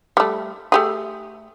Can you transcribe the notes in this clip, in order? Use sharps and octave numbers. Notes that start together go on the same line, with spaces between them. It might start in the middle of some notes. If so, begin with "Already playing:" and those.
G3 A3
A3 G4 G#4